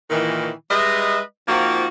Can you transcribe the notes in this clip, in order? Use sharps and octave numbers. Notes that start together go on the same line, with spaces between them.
A#2 D#3 E3
G3 G#3 B4 D#5 E5
F3 A#3 C4 D#4 F4 F#4